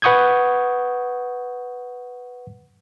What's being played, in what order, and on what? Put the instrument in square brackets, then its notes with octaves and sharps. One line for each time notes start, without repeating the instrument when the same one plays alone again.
[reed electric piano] B4 F#5 C#6 D#6 G6 G#6